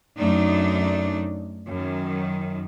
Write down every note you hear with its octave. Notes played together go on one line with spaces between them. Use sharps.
F#2 A3 D4 D#4
F#2 D#3